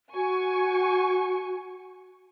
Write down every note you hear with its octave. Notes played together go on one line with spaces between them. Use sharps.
F#4 G#5 C#6